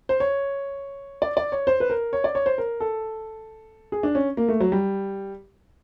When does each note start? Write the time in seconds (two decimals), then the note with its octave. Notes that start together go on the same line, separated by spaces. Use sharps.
0.09 C5
0.20 C#5
1.22 D5
1.37 D5
1.52 C#5
1.67 C5
1.80 B4
1.90 A#4
2.13 C#5
2.24 D5
2.35 C#5
2.46 C5
2.58 A#4
2.80 A4
3.92 G#4
4.03 D4
4.15 C#4
4.37 A#3
4.49 A3
4.60 F#3
4.72 G3